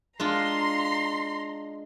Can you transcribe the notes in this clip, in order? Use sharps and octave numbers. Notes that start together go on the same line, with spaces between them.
G#3 D4 F4 A#5 C6